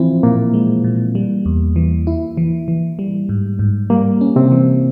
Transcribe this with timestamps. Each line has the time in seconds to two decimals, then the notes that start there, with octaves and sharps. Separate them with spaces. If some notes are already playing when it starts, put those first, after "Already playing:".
Already playing: E3 F3 C4 E4 F4
0.23 A#2 A#3
0.54 G#3
0.84 A#2
1.15 G3
1.46 E2
1.76 E3
2.07 E4
2.37 E3
2.68 E3
2.99 G3
3.29 G#2
3.59 G#2
3.90 G3 A#3
4.21 C#4
4.36 C3 C4
4.52 E3